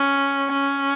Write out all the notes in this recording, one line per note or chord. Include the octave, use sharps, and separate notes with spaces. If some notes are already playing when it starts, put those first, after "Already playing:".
Already playing: C#4
C#4